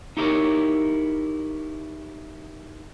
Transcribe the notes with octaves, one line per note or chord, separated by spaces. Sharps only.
D#4 E4 G4 A4 A#4 C#5